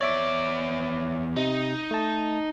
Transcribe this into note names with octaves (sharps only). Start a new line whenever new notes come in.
E2 C#5 D5 E5 D6
C3 D#4
A3 A5